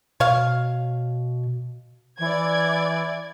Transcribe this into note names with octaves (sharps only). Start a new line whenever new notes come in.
B2 C#5 F5
E3 D5 G#6